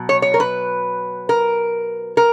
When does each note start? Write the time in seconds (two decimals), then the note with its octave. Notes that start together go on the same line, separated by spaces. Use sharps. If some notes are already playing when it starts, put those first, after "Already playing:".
Already playing: B2 F#3
0.09 C#5
0.22 C#5
0.34 A#4
0.40 B4
1.29 A#4
2.17 A#4